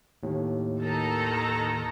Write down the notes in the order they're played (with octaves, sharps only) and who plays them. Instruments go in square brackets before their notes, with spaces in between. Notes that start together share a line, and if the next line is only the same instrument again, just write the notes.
[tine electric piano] D#2 A2
[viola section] D#3 A4 A#5